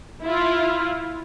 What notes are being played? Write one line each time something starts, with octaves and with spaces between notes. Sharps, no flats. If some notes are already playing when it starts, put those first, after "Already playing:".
E4 F4